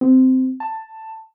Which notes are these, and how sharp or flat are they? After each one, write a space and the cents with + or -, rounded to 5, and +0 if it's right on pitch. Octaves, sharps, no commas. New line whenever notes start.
C4 -15
A5 +10